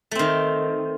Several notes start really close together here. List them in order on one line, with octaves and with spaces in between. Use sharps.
A3 C4 D#3